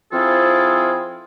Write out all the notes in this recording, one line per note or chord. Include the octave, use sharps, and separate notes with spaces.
F3 C4 E4 F4 G#4 A4